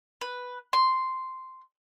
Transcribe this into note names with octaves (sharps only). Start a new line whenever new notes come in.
B4
C6